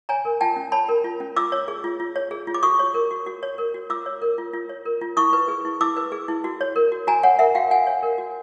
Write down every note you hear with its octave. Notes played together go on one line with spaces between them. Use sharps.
C#5 G#5 A#5
A#4
F4 G5 A5
C#4
C#5 A5 B5
A#4
F4
C#4
F4 D6 E6
C#5
G#4
F4
F4
C#5
G#4
F4
D6
F#4 C#6 D#6
C#5
A#4
F#4
F#4
C#5
A#4
F#4
F4 D6 E6
C#5
A#4
F4
F4
C#5
A#4
F4
E4 C#6 D#6
B4
G#4
E4
E4 D6 E6
B4
G#4
E4
F#4
C#5
A#4
F#4
F#4 G#5 A#5
C#5 F#5 G#5
A#4 E5 F#5
F#4 F5 G5
F#4 F#5 G#5
C#5
A#4
F#4